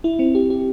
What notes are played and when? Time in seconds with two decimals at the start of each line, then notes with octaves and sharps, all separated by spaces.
0.04 E4
0.19 C4
0.35 G4
0.50 G4